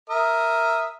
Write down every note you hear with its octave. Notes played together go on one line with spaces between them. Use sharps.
A#4 E5 D#6